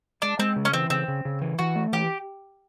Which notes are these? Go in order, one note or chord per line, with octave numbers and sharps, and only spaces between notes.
G#3 D4
G#3 C4
C#3
C#4
E3 C4
C#3 C4
C#3
C#3
E3
E3 F#4
A3
E3 G4